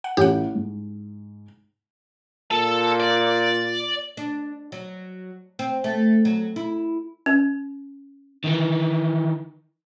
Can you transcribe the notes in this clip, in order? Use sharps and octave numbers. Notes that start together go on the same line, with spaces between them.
F#5
A1 G4 F#5
G#2
A#2 A4 A5
D5
D4
F#3
C4
A3
F#3
E4
C#4
D#3 E3